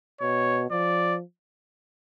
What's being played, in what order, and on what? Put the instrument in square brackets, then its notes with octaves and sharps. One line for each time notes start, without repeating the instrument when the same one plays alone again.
[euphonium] B2 [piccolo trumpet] C#5
[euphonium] F3 [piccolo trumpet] D5